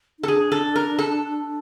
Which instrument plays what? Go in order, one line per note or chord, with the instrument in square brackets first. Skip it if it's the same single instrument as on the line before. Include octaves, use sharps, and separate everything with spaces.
[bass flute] D#4
[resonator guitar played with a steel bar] A4
[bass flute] D4 [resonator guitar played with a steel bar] G#4
[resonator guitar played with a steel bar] A4
A#4
A4